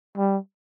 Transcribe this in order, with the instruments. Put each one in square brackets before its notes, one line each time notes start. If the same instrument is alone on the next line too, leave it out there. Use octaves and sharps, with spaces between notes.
[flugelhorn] G3